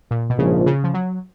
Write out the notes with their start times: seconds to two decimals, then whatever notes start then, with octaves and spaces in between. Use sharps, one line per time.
0.11 A#2
0.30 B2
0.38 A#1 G#2 C#3 F3
0.66 C#3
0.84 F3
0.94 F#3